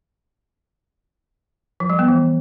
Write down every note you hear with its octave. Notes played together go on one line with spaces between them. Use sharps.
F3
G3
B3
E3